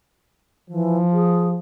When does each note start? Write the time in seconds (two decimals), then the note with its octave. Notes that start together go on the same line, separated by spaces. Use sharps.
0.70 E3 F3
1.13 G#4